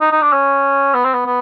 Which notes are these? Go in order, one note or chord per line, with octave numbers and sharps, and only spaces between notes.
D#4
D#4
D4
C#4
B3
C4
B3
B3